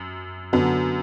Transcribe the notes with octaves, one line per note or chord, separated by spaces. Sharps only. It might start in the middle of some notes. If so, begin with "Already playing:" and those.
Already playing: F#2
F#2 D3 F#3 B3